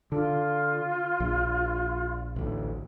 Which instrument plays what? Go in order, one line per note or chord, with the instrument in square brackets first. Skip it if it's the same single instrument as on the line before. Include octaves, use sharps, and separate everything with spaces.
[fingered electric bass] D3 [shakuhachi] F4
[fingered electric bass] A#1
A1 D2